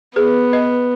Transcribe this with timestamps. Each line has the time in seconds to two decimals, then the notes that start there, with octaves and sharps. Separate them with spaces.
0.16 B3 G#4 B4
0.53 B4 D#5